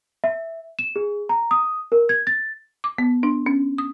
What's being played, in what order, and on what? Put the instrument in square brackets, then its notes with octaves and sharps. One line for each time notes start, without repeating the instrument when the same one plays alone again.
[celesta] E5
E7
G#4
A#5
D#6
A#4
G#6
A6
[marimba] D6
B3
D4
C#4
D#6